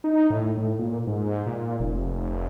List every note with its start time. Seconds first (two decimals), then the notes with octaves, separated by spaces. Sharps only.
0.04 D#4
0.30 A2
0.57 A2
0.79 A#2
1.07 G#2
1.46 A#2
1.80 F1